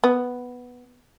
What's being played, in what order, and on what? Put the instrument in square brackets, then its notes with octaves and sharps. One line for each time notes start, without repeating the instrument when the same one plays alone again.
[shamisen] B3